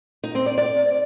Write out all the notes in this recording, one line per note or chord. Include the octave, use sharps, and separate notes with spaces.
D#4
C4
D5
D5